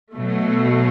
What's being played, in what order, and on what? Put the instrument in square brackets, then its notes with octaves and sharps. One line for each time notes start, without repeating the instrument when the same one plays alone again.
[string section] B2 F#3 A3